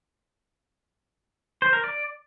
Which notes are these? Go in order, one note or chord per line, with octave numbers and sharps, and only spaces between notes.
C5
A#4
D5